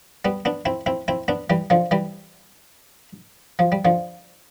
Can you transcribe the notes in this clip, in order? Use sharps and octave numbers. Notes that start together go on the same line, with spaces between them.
G3 B3
B3 D4
C4 E4
C4 E4
C4 E4
B3 D4
E3 G3
D3 F3
E3 G3
F3
G3
D3 F3